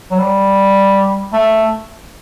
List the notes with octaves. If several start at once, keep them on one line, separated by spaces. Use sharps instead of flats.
F#3
G3
A3